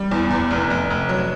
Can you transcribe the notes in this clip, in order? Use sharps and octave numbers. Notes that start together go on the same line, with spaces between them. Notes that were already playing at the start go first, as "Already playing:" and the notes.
Already playing: G3
E2
E2
F1
F1
F1
F#3